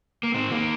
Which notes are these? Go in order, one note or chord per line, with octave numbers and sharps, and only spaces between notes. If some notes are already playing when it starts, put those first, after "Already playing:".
A#3
D#3 C4
D#3 A#3